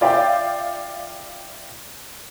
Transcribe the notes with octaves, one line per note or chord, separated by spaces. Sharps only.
F4 D5 E5 G5